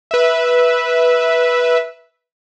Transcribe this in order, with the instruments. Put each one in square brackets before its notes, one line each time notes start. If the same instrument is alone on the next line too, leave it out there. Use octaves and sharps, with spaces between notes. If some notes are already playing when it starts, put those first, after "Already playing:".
[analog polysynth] B4 E5